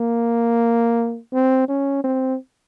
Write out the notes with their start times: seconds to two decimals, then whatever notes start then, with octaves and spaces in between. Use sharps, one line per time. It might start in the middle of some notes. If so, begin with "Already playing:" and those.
Already playing: A#3
1.33 C4
1.68 C#4
2.04 C4